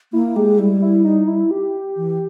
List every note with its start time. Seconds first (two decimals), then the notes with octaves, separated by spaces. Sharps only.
0.13 A#3 E4
0.36 G#3 G4
0.59 G3 E4
0.82 E4
1.04 D#4
1.28 E4
1.51 G4
1.97 E3